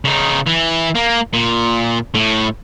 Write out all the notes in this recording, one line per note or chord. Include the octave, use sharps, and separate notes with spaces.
C#3 D#4
E3
A#3
A#2
A2